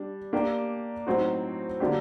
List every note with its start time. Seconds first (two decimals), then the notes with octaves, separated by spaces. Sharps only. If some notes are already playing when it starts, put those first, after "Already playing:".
Already playing: G3 D4
0.33 A#3 D4 G4
1.07 A2 F#3 C4 D#4 F#4
1.80 D3 F#3 A#3 D4 G4